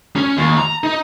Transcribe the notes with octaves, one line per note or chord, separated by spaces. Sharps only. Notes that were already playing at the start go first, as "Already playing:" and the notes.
C#4
D#2
A#5
D#4